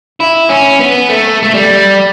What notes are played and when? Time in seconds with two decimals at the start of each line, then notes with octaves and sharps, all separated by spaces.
0.20 E4
0.49 C#4
0.80 B3
1.09 A3
1.42 A3
1.54 G3